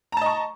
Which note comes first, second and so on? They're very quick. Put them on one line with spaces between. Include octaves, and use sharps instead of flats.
A#5 A5 D#5 C#6